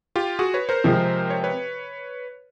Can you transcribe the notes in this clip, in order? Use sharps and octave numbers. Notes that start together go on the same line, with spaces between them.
F4 G4
F#4 G#4
B4 C#5
A#4 C5
C3 F3 G#3
C#5
B4 C#5